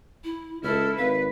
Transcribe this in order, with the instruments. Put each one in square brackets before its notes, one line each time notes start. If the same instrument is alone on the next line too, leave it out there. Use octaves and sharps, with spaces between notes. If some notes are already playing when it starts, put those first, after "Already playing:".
[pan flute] E4
[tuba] C#2 [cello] E4 A4 [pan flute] F6
[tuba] G#1 [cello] B4 [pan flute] F5